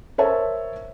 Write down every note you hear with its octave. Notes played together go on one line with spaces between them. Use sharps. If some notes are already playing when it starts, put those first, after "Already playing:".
A#4 C5 C#5 E5 A5